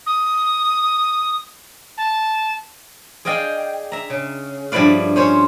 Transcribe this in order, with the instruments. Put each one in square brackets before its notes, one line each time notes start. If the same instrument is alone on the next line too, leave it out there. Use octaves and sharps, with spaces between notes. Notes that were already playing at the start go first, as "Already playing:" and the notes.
[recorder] D#6
A5
[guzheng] G#4 D5 D#5 F5 G5
E5 A#5
C#3
G2 F3 E4 B4 D5 F5
C#4 C5 C#5